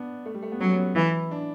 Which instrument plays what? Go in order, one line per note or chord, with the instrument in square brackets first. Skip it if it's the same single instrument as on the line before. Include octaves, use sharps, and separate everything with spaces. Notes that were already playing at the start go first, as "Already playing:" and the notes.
Already playing: [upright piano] B3 D4
A3
G3
A3
B3
[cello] F#3 [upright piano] C#4
[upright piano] B3
[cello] E3 [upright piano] E4
[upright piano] D4